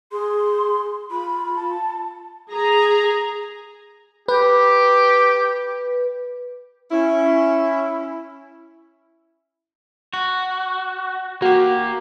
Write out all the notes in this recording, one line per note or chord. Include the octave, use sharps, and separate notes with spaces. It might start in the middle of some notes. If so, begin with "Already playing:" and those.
G#4 C6
F4 B5
A5
G#4 A#5
G4 B4
C#4 E4
F#4
A#3 F#4 G4